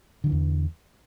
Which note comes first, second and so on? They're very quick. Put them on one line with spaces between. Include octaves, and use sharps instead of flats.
D3 F3 E3 E2